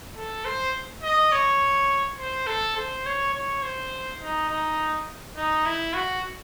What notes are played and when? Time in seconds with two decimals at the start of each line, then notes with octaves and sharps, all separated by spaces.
0.17 A4
0.45 C5
1.03 D#5
1.32 C#5
2.18 C5
2.47 A4
2.77 C5
3.06 C#5
3.34 C#5
3.62 C5
4.20 D#4
4.49 D#4
5.36 D#4
5.66 E4
5.94 F#4